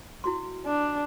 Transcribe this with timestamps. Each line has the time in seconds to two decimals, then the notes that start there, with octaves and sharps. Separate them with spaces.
0.24 E4 F#4 C6
0.66 D4